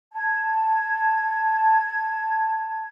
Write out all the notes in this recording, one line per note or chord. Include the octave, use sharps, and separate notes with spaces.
A5 G#6